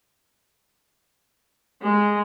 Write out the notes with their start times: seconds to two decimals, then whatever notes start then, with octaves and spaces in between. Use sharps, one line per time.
1.81 G#3